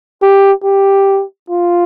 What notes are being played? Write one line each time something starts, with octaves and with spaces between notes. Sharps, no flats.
G4
G4
F4